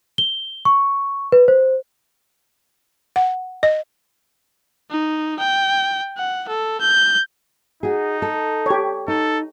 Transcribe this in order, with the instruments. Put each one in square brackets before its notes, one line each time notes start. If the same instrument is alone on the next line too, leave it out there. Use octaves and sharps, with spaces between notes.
[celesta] G7
C#6
B4
C5
[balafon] F#5
D#5
[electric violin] D#4
G5
F#5
A4
G6
[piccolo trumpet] D#4 [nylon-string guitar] F#4 G#4
[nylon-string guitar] A4
[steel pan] G4 C#5
[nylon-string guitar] D#4 [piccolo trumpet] A4